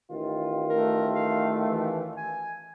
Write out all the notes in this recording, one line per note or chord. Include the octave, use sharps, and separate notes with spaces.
A1 D#3 F4
A3 A#4
F5
E3
G#5